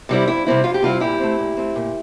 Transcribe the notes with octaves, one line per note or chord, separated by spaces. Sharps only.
C3 G3 C4 E4
F2 E4
C3 G3 C4 E4
F2 F4
G4
C3 G3 C4 E4 F4
A#2 E4 G4
A3 C4
A#2
A3 C4
A#2